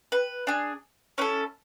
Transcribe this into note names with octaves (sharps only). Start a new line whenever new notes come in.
B4
D4 G#4
C#4 E4 A4 B4